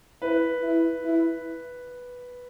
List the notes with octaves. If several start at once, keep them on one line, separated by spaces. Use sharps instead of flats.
E4 B4
E4
E4